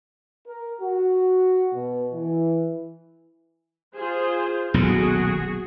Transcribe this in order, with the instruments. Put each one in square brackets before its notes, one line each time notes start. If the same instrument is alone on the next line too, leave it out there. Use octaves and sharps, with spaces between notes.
[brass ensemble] A#4
F#4
B2
E3
[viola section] F4 G#4 C5
[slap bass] D#1 B1 A2 [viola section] F#4 G#4